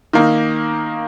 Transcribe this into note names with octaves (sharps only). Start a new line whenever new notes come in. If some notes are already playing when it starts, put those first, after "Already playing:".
D#3 A#3 D#4